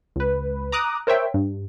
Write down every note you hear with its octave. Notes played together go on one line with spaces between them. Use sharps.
C#2 B4
A#5 D6 D#6 F#6
A#4 C5 C#5 E5 G5
G2